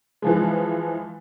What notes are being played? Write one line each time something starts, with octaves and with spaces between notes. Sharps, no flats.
E3 F3 G#3